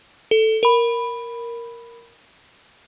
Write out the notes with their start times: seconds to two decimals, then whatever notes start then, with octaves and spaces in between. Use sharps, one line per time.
0.31 A4
0.63 A#4 B5